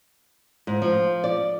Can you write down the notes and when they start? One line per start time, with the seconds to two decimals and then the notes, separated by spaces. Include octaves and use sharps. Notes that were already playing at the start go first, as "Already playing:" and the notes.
0.67 G#2
0.82 F3
1.24 D5